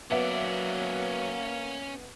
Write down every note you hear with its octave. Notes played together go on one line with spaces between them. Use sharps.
F#3 A#3 B3 C#4 D5 E5